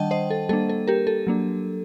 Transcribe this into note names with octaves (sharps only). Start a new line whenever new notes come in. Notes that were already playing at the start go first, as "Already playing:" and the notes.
Already playing: D#3 G3 D4 D#5 F#5 G5 A5
C5 D#5
A4
G3 A#3 D4 A4
A4
G4 A#4
A4
F#3 A#3 D4